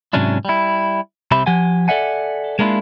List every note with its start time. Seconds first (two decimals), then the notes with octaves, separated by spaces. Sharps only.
0.13 G#2 C3 F#3 C#4 D4 E4
0.45 G3 E4
1.31 C2 C3 C4 G4 E5 B5
1.46 F3 G4 F#5 G#5
1.88 A4 D5 E5 F#5 G#5
2.59 G#3 A#3 D4 E4 F4